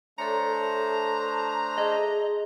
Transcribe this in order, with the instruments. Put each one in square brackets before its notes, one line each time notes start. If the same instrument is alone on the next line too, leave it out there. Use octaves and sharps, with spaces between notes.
[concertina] A3 D4 C5 [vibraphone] A4 C#5 [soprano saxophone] A#5
[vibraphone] G#4 [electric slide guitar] D#5